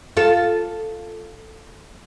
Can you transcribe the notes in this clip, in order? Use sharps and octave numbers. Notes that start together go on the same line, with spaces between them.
F4 A4